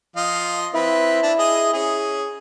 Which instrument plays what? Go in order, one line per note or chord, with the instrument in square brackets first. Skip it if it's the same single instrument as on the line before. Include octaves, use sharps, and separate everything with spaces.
[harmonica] F3 D#5 F5
[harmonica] C4 B4 [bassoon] E4
[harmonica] D4
G#4 D#5
C#4 G#4